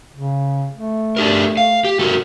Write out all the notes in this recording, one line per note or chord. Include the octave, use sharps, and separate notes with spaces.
C#3
A3
D4 G4 A#4
F5
G4
A3 F#4 A#4